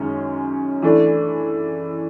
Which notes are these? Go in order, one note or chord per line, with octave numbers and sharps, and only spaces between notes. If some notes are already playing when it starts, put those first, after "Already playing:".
Already playing: F#2 D#3 G#3 C#4
E3 A3 D4